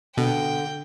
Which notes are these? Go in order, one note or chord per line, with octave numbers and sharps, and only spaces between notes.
B2 D3 G5